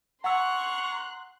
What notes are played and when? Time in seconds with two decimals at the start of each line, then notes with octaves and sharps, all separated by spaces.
0.24 F#5 A#5 C6 C#6 E6 F#6